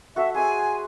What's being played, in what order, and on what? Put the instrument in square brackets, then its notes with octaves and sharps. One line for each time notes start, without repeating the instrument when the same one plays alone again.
[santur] F#4 A4 [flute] E5
[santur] G#4 C5 E5 [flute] G#5